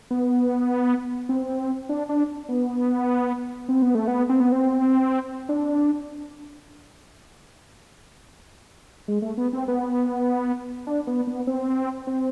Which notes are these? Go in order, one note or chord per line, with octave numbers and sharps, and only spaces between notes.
B3
C4
D4
D4
B3
C4
B3
A3
B3
C4
B3
C4
D4
G#3
A3
B3
C4
B3
D4
B3
B3
C4
C4